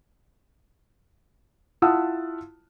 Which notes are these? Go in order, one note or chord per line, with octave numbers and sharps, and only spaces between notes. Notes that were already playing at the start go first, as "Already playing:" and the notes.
E4 F4 F#5 A5 D#6 E6